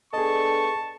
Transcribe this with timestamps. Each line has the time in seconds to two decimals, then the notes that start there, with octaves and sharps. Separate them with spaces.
0.13 B3 D4 G#4 A4 D#5 A5 C#6